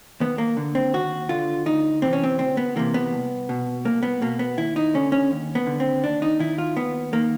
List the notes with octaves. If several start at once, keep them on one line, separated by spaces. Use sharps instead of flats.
D#2 B3
A#3
D3
C4
D#2 F#4
D3 F4
D2 D#4
C3 E3 C4
C#4
C4
D2 C4
B3
C3 E3 A#3
B3
C2
B2
C2 A#3
B3
B2 A#3
B3
D#2 E4
D#4
D3 C#4
C#4
D#2
B3
D3
C4
D#2 D4
D#4
D#3 E4
F4
D#2 B3
D#3 A#3